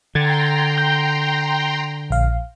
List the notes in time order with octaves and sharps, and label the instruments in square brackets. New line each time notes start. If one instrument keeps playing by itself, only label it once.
[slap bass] D3 [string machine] G5 A#5 C6 [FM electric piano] G#6 A6
[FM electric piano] G6
A#1 F5